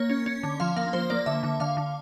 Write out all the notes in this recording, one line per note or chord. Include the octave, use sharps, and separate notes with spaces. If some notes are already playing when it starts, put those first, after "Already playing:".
Already playing: A#3 C#5
C#4
C#4
D3
F3 F5
A#3 F5
F3 C5
A#3 D5
D3 E5
D3
D3 F5
D3